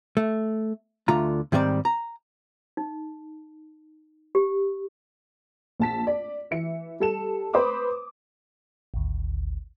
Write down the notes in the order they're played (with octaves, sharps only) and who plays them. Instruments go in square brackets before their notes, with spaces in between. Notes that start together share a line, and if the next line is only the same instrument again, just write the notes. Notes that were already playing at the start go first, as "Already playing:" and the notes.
[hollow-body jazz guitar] A3
D2 D3 A3 F4 A#5
G#2 D#3 G3 C4 D5
A#5
[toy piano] D#4
G4
[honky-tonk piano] A#1 A5 B6
D5
E3 E5 C#7
G3 A4 E7
B4 C5 B5 D6 D#6
[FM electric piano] G#1 D2